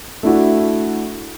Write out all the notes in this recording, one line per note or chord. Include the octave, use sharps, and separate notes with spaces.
A3 D4 E4 F#4